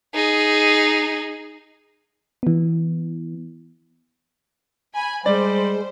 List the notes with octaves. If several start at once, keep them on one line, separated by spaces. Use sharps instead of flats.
D#4 G#4
E3 B3
G#5 B5
G3 G#3 C5 D5